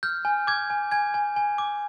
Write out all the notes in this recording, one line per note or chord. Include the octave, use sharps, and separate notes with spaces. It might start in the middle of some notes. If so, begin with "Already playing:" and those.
F6 G6
G#5
D6 G#6
G#5
G#5 G#6
G#5
G#5
D6